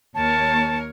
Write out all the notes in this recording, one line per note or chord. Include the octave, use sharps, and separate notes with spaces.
D#2 A#4 C#5 A5